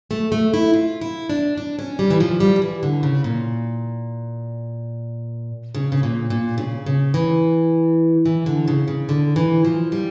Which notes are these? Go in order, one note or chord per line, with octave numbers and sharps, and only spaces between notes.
A3
A3
E4
F4
E4
D4
D4
C#4
G3
E3
F3
G3
F3
E3
D3
C#3
A#2
C#3
C#3
A#2
A#2
C#3
C#3
E3
E3
D3
C#3
C#3
D3
E3
F3
G3